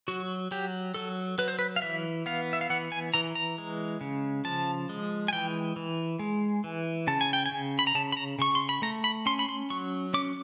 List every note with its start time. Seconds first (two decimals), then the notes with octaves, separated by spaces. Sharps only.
0.08 F#3 F#4
0.51 F#3 G4
0.94 F#3 A4
1.38 F#3 B4
1.48 C5
1.59 B4
1.76 F5
1.82 E3 E5
2.26 B3 F5
2.53 E5
2.61 F5
2.70 E3 F#5
2.92 G#5
3.14 E3 A#5
3.35 A#5
3.58 G#3
4.01 C#3
4.45 F3 A5
4.89 G#3
5.28 G#5
5.33 E3 G5
5.76 E3
6.19 G#3
6.64 E3
7.07 C#3 A5
7.21 G#5
7.33 G5
7.46 G#5
7.52 C#3
7.79 B5
7.87 A#5
7.95 C#3 A5
8.12 B5
8.17 A#5
8.39 C#3 C#6
8.55 C6
8.69 B5
8.82 A3 A#5
9.04 B5
9.26 C#4 C6
9.39 B5
9.49 C6
9.70 F#3 C#6
10.14 C#4 D6